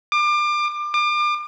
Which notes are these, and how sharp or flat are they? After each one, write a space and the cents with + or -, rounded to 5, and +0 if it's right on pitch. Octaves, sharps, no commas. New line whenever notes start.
D6 +30
D6 +35